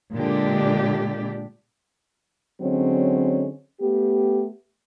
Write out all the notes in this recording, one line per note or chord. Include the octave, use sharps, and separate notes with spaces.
A#2 D3 G#3 D4 G4
D3 F#3 G#3 C4 C#4
A3 B3 G4